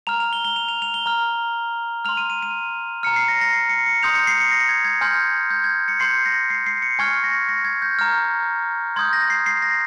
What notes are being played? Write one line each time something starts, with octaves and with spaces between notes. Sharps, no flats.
A#5 F6 F7
F7
G7
G7
F7
F7
F7
G7
A#5 F6
C6 F6 F7
D#7
D#7
D#7
A#5 F6 C#7
C7
A#6
A#6
C7
C#7
C#7
C6 D#6 G6 F7
C#7
C7
C#7
A#6
G#6
G#6
G#5 C6 F6 G6
G6
G#6
C#7
C6 G6 C7
A#6
C7
C7
C#7
G#5 C#6 F6 G#6
A#6
A#6
G#6
G6
A#5 F6
C6 D#6 G6 G#6
A#6
C7
C7
A#6